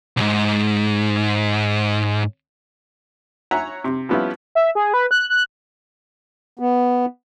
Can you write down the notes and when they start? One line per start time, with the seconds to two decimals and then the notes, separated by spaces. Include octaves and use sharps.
0.17 B1 G#2
3.51 C#5 E5 F#5 G#5 A#5
3.84 C3
4.09 F3 G3 B3 C#4 E4 F4
4.55 E5
4.75 G#4
4.94 B4
5.11 F#6
5.30 F#6
6.59 B3